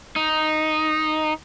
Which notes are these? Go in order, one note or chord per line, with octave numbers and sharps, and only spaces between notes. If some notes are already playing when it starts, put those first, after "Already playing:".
D#4